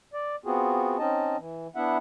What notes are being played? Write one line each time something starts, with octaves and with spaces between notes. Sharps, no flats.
D5
B3 C4 F4 F#4 G#4
C4 C#4 D#4 D#5 A5
E3
B3 D4 E4 E5 F#5